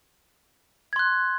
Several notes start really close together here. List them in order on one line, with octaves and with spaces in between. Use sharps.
G#6 C6 F#6